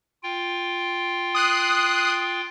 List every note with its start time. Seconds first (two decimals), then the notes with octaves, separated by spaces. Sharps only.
0.23 F4 G5
1.35 D#6 F#6 C7